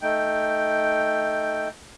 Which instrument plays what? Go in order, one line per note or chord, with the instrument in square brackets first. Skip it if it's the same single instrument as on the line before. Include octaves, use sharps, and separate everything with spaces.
[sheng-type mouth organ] A3 D#4 G5